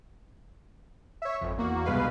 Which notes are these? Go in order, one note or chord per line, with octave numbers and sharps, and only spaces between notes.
C#5 E5
G#1 F2
E2 A#3 F#4
C2 G2 B2 G#3 B4 F5